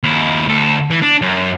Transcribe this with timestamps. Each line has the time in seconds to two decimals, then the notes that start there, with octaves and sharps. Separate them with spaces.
0.03 D#2 E4
0.48 D2 A4
0.90 E3
1.02 D4
1.22 F#2